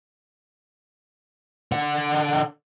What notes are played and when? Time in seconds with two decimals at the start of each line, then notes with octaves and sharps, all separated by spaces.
1.72 D3 F#5